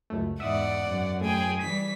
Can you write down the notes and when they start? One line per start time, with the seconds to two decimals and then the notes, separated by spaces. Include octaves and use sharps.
0.10 C#2 F#2 A3
0.40 E2 G#2 D5 E5 F#5 D#6
0.84 F#2
1.21 A2 G#4 G5
1.62 E3 G3 B6